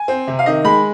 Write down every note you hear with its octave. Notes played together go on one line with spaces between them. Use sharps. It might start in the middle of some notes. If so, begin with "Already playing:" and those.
Already playing: G#5
C4
C3
F5
D#3 D#5
G#3 B5